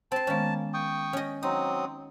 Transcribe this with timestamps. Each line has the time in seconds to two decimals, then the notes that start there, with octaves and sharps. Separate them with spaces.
0.12 C4 A5 C6
0.27 D#3 G#3 A#3 B3 C#4
0.74 G5 C#6 D#6
1.13 C#4 D#5
1.43 F#3 C4 D#4 D#6